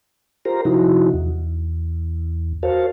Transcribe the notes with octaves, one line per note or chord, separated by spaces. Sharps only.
F4 G4 A#4 C5 A#5
C3 F3 D#4 E4 F#4
E2
F#4 A#4 C5 C#5 F5 A5